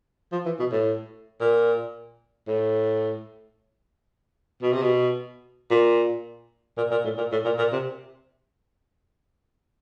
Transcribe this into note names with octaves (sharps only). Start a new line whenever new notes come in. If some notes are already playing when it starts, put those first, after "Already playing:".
F3
E3
B2
A2
A#2
A2
B2
C3
B2
A#2
A#2
A#2
A2
A#2
A2
A#2
A#2
C3